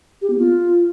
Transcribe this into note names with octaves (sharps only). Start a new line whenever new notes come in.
G4
B3
F4